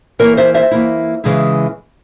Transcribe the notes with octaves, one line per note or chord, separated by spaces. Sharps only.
E3 A#3 E4 A#4 C#5
C5 E5
C5 E5
E3 A#3 E4
C#3 E3 G#3 E4